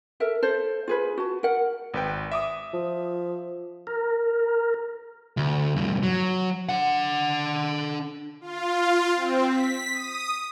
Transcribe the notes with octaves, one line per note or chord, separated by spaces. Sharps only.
A4 A#4 E5
A4 C5
F4 G#4 B4
F#4 A5
A#4 F#5
G#1 B4 G5
E5 D6 D#6
F3
A#4
D2
E2 G2
F#3
D4 F#5
F4
C4
B6
D#6